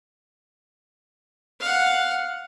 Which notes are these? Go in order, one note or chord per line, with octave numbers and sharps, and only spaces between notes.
F5 F#5